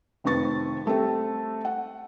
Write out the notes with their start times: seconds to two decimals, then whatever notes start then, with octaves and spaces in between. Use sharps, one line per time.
0.24 F1 F2 D#3 B4 C#6 A6
0.86 G3 A3 C4 A4
1.65 F#5